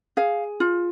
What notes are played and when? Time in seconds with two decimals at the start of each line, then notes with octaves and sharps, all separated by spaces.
0.17 G#4 F5
0.60 F4